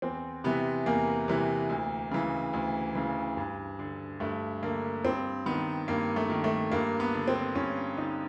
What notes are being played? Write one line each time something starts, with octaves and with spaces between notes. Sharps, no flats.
E2 C4
C3 E3 B3
E2 A#3
C3 E3
D2
C#3 E3
D2
C#3 E3
G2
D3
G2 A3
D3 A#3
G2 C4
D#3 B3
G2 A#3
A3
D#3
A3
G2 A#3
B3
D3
C4
G2 C#4
D3 D#4